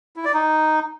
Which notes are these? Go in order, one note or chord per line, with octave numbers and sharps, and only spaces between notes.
E4
D5
D#4